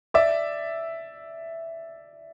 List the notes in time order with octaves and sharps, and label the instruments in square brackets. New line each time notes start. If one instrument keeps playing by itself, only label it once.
[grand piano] D5 E5